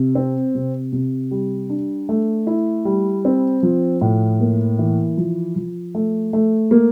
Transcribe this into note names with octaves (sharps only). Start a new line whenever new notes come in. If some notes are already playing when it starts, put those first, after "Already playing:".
Already playing: C3
C4
C3
C3
G3
D4
A3
E4
G3
C4
F3
A2
A#3
E3
F3
F3
A3
A3
A#3